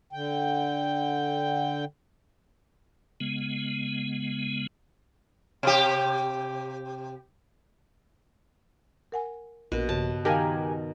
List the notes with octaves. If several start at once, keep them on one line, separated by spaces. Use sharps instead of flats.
D3 G5
C#3 G#3 B3
C3 G4
A#4 F#5 G#5
A#1 B2 F#4 A#4
G2 C#3 A5
D#3 G4 A#4 F5 G#5 A5